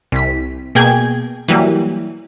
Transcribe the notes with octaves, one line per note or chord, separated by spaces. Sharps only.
C2 B6
B2 A#3 G#4 G5 G#6
E3 F#3 G3 A#3